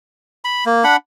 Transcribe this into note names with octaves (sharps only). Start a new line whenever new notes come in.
B5
A#3
D4 F#5 B5